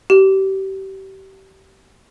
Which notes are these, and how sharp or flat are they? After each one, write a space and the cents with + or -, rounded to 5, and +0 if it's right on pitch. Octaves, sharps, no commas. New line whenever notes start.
G4 -30